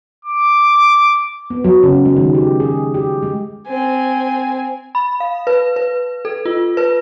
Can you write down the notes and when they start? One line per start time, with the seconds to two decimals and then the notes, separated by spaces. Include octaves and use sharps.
0.25 D6
1.50 B3
1.64 F#3
1.83 C#3
2.05 G#3
2.16 D#3
2.34 G4
2.60 G#4
2.94 G4
3.22 G#3
3.67 C4 G#5
4.95 B5
5.20 F5
5.47 B4
5.76 B4
6.25 A4
6.45 F4
6.77 B4